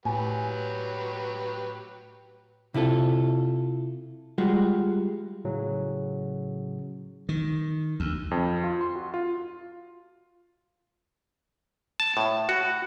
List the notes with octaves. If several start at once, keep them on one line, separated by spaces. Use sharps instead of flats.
A2 F#3 G4 B4 G#5
C3 E4 F4 A4
G3 G#3 F4 F#4
A2 C#3 F#3 C#4
D#3
D2
F2
F4
C6
F#4
F4
A5
A2
F#4